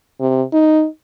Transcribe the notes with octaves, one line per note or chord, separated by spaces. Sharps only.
C3
D#4